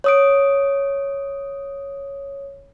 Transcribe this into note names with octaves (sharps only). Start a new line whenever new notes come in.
C#5 D#6 D7